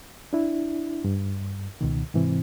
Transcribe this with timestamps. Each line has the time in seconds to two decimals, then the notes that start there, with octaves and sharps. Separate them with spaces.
0.33 D4 E4
1.05 G2
1.81 C#2 B2 D#3
2.14 G#2 C3 E3 C4